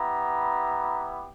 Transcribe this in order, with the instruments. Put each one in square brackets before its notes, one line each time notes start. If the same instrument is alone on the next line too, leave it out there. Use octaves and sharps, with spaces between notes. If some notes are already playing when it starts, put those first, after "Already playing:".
Already playing: [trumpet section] B3 E4 G4 A#5